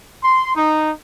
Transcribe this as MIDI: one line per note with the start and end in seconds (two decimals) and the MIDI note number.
0.23 0.52 84
0.56 0.90 63